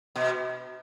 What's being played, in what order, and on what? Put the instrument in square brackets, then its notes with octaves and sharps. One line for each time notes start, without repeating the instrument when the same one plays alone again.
[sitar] B2